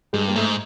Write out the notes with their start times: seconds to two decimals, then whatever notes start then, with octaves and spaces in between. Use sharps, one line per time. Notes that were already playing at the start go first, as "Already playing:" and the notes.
0.13 G2 G#3
0.28 A#3
0.36 G#2 A3